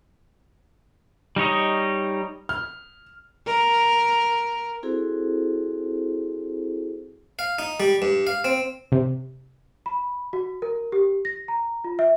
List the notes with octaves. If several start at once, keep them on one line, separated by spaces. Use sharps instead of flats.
G3 D#4 C#5 D#5
F6
A#4
C4 E4 F#4 G#4 A4 C5
F5
D#4
G3
G2
F5
C4
C3
B5
F#4
A#4
G4
A#6
A#5
F4
E5